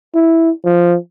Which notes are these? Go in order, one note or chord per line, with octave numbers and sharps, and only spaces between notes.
E4
F3